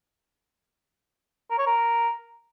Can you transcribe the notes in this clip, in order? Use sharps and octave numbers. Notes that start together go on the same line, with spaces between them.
A#4
C#5
A#4